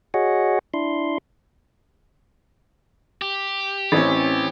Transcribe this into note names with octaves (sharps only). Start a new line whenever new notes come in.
F#4 G#4 C#5 D#5 F#5
D4 E4 C6
G4
A1 E3 C4 C#4